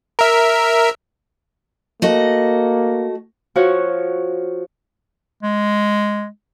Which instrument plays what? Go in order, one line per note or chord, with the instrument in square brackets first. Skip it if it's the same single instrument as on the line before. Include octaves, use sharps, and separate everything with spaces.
[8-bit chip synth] A#4 E5
[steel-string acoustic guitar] A3 F#4 D#5 [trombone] A#3
[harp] F3 F#4 C#5
[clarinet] G#3